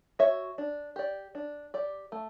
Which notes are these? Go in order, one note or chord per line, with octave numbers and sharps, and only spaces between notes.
F#4 C#5 E5
D4
G4 D5
D4
G4 D5
A3